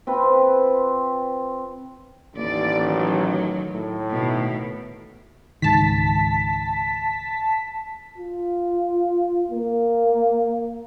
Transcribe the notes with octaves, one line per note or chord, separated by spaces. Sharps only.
C4 F4 B4
A1 D#2 D5
D#3 F#3
A2
B2 D#3
C#2 G#2 D#3 A5 B6
F4
A#3